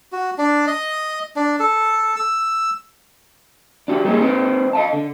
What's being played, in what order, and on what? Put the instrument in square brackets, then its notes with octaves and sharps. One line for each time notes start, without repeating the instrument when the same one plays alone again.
[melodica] F#4
D4
D#5
D4
A4
E6
[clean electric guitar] D4 F#4 G4
G3 A#3 D#4 G4 G#4 C#5
C4 D#4 B4 C5 G5
D#5 F5 A5
D3